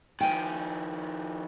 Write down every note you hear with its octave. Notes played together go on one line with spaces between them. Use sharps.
D#3 F3 G5 G#5